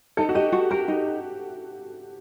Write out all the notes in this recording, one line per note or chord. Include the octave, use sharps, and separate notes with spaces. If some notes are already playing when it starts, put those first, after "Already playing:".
D#4 A4
F#4
G4 D#5
F#4
G4 A#4
D#4